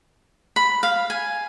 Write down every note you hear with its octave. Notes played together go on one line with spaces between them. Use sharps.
B5
F5
G#5